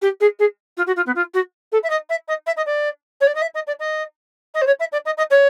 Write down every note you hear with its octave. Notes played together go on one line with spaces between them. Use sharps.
G4
G#4
G#4
F4
F#4
F4
B3
F4
F#4
A4
E5
D#5
E5
D#5
E5
D#5
D5
C#5
D5
D#5
E5
D#5
D5
D#5
D#5
C5
C#5
E5
D5
D#5
D#5
C#5